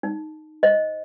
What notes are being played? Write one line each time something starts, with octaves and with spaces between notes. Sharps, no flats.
D#4
C5 D#5